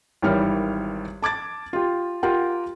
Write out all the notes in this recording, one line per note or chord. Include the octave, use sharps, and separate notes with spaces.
G#1 D#3 E3 G3 C#5 F6
A5 D6 G#6 A6
F4 G4
F4 G4 A#4 F#5 G5